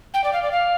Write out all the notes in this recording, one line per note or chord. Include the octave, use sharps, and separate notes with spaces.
G5
D5
F5
D5
F5